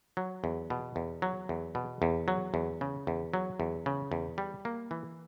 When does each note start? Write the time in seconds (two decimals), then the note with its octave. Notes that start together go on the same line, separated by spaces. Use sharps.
0.17 F#3
0.44 E2
0.70 B2
0.96 E2
1.22 F#3
1.49 E2
1.75 B2
2.02 E2
2.28 F#3
2.54 E2
2.81 C#3
3.07 E2
3.34 F#3
3.60 E2
3.86 C#3
4.12 E2
4.38 G3
4.65 A#3
4.91 E3